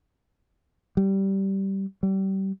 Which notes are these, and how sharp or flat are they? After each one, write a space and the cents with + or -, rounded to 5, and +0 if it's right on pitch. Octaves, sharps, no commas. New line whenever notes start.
G3 -15
G3 -30